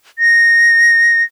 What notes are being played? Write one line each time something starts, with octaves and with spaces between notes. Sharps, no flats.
A#6